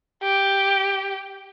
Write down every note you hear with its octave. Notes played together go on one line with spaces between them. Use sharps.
G4